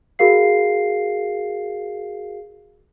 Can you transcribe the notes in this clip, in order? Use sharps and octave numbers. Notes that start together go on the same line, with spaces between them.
F#4 G#4 A#4 F5 C7